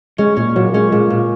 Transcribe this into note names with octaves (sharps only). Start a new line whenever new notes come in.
G#3 C#4
A#2 C#4
A#2 F#3
G#3 C#4
A#2 G#3
A#2